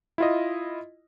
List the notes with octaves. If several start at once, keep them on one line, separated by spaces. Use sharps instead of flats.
E4 F4 D#5